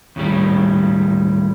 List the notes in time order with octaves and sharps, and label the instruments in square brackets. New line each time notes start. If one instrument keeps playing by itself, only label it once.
[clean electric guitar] D#2 A2 G3